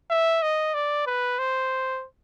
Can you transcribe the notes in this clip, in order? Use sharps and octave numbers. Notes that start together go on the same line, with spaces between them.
E5
D#5
D5
B4
C5